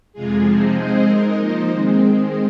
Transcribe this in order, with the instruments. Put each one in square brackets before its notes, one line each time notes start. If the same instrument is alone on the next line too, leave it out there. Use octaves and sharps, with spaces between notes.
[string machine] F2 C3 G#3 F4 G#4
C3 F3 C4 D#4 G#4
G#3 C4 G#4 C5 D#5
G#3 D#4 A#4 D#5
F3 A#3 D#4 C5 D#5
D#3 G#3 C4 G#4